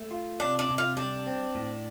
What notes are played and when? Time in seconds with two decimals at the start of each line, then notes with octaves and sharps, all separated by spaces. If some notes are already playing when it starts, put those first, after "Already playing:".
Already playing: A3
0.11 F4
0.40 C3 D4
0.59 D4
0.69 C3
0.78 F4
0.97 G3 D4
1.27 C4
1.55 A2